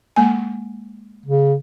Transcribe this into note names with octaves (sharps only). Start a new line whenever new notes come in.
G#3 A#3 G#5
C#3